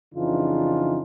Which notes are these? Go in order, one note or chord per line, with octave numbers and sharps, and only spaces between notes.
F2 C#3 E3 D4 D#4 F4